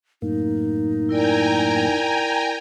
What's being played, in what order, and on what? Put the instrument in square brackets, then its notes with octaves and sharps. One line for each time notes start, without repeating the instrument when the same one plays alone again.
[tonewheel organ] F#2 A2 A#3 [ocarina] D#4
[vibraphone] E4 A#4 D5 [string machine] G5 G#5 A#5